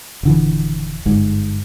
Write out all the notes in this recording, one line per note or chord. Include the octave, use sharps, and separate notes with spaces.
D#1 D3 E3
G1 G#2